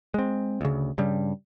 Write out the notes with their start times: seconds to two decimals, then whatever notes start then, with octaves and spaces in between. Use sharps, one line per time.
0.14 G#3 C4
0.61 D2 C#3
0.98 G2 C#3 G3